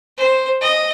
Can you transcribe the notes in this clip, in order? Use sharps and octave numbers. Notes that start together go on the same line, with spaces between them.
C5
D#5